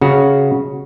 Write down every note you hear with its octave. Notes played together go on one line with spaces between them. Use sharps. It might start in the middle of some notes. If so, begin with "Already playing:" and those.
C#3 F#4